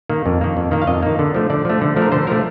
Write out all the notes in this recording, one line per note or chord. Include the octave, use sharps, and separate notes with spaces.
D#3 A#3
F2
D#3 A#3
F2
D#3 A#3
F5
F2 D#5
D#3 A#3
D3
F3 A3
D3 D5
F3 A3
D3
F3 A3
A#4
D3 C5
F3 A3 A#4